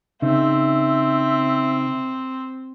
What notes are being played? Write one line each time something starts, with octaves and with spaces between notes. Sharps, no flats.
C#3 C4 D#4 E5